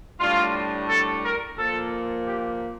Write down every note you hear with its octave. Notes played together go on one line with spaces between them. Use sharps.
A2 G3 D4 F4
A4
A#4
A#2 F3 A#3 A4
G4